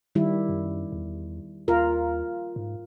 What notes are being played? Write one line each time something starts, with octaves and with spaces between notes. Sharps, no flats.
D#3 G3 E4
F#2
E2
D#2 F4 A#4
G#2